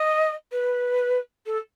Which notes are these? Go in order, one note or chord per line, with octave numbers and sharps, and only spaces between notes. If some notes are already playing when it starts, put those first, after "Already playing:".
Already playing: D#5
B4
A4